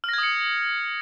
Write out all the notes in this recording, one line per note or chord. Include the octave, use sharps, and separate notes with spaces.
D#6 F6 G#6 A#6 C#7